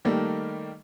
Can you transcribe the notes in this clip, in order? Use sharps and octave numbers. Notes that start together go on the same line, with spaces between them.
D#3 G3 A3 A#3